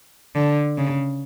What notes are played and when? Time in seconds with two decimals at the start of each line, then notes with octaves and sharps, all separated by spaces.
0.35 D3
0.78 C#3